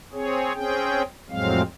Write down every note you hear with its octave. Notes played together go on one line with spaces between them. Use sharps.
C4 G#4 C#5
C4 C#4 G#4 G5
F2 A2 F#3 G#3 C4 F5